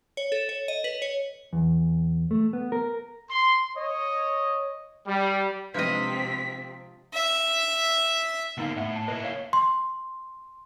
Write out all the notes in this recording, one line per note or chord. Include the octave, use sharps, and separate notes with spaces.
C#5
A4
C#5
D#5
B4
C#5
E2
A3
B3
A#4
C6
C#5 D#5
G3
C3 F3 G#3 C4 D4 B4 D#5 B6
E5
D3 A#3 B3 D#4 F5
A2 E5 F#5
A5
A#3 E4 B4 D#5
C#5 F5
C6